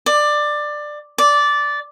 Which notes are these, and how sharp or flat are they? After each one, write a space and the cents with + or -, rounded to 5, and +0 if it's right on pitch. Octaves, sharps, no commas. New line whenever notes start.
D5 +15
D5 -10